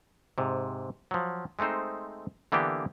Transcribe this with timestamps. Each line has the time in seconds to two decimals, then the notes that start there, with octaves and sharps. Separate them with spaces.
0.38 G#2 C3
1.11 F3 F#3
1.59 G#3 A3 C4 D#4 C5
2.52 D3 E3 A#3 B3 D4 G4